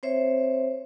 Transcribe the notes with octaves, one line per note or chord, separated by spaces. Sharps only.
C4 C5 C#5 E5